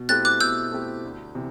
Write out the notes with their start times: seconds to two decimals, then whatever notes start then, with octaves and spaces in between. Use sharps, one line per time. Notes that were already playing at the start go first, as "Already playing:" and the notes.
Already playing: B2
0.09 A3 C4 E4 G4 F#6 A6
0.25 D6 F#6
0.40 B2 E6 G6
0.72 A3 C4 E4 G4
1.04 D2
1.35 C3 E3